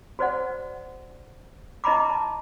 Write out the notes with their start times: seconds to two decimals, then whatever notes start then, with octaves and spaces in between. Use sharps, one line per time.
0.19 F#4 C5 D5 F#5
1.84 E4 D#5 A#5 B5 D6
2.10 A5